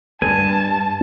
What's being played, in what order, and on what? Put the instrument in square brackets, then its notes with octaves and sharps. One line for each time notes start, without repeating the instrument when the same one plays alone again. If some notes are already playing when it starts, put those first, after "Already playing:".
[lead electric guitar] G2 [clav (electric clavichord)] G#5 [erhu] A5